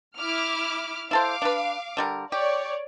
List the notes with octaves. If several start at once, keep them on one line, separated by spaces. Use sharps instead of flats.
E4 D6 F6
E4 A4 C5 F5 D6
D4 B4
D3 G3 A#4
G4 C#5 D5